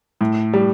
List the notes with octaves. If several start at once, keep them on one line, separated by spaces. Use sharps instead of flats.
A2
G3